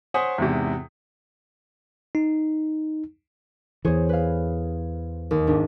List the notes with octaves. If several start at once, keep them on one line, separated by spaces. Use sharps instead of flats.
C5 C#5 F#5 G#5 D#6 B6
E2 G#2 C3
D#4
E2 E3 G#4 C5 C#5
B4 F5
D#2
G#1 D4